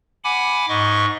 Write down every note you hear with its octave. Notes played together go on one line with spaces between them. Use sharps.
F#5 G#5 B5 D6
G#2 D#5 C#6